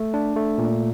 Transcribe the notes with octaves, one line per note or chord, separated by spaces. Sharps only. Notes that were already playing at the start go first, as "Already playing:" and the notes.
Already playing: A3
D4
A3
A#2